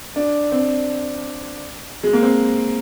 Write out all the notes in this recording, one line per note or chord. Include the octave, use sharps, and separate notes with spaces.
D4
C4
G#3
A#3
C4